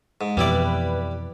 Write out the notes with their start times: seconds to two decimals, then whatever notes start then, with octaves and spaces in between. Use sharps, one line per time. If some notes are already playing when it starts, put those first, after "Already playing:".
0.21 G#2
0.37 F2 B2 E3 G3 E4 B4 D5